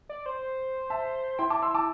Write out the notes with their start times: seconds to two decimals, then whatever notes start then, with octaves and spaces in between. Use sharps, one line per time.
0.09 D5
0.26 C5
0.90 E5 A5
1.39 E4 G5 C6
1.50 A5 D6
1.62 C6 E6
1.74 A5 D6